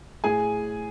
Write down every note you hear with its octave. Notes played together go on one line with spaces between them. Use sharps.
A2 G#4 G#5